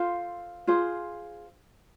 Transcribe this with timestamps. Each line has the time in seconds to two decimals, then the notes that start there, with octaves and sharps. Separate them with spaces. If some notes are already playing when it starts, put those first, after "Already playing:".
Already playing: F4 A4 C5 F5
0.67 F4 G#4 C5